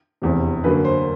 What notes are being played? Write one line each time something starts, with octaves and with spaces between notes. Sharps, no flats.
F1 E2 C3
F#2 D3 F#3 A#3 B4
C5